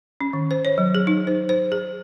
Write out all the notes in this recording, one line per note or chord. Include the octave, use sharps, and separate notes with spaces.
C#4
D#3
C5
C#5
F#3
G#4
D#4
C5
C5
G#4